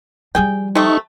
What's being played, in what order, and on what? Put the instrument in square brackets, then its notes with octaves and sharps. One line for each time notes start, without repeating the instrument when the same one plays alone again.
[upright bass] F3 G3 [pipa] G#4 G5
[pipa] C3 A3 [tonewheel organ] D#4 C#6